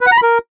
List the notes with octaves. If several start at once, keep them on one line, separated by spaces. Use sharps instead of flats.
B4
F#5
A#5
B5
A#4